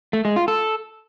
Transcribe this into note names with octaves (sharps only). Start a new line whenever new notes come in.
A3
G#3
F4
A4